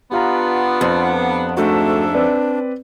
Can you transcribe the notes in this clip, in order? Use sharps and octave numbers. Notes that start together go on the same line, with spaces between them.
B3 D4 F4 G4 F5 A#5
F2
G#2 A3 D4 F#4 A4 E5
C4 B4 D5